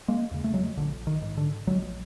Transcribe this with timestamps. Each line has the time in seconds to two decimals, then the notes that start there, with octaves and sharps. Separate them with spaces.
0.08 G#3 A#3
0.31 E2 C#3
0.44 A3
0.54 F#3 G#3
0.77 A#1 D3
1.07 D#3
1.22 G#2
1.37 D3
1.67 A#1 F#3 G#3